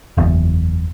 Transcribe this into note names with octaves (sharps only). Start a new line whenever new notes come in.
F#1 E2